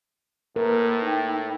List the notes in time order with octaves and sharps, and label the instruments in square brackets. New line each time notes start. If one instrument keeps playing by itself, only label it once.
[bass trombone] A2 [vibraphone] A#3 B4 [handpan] A#4
[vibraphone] D#4 G5